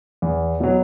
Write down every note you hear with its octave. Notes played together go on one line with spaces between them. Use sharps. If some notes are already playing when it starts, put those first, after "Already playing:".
E2
B2 F#3